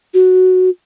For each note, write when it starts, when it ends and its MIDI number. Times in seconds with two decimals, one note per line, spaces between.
0.14 0.70 66